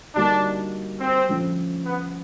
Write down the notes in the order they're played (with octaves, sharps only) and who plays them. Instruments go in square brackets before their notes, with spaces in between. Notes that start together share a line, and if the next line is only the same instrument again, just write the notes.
[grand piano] D3 G3 A#3 D#4 F#4 [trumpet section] D4
[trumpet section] C4
[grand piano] D3 F3 A3 C#4 F4
[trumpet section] B3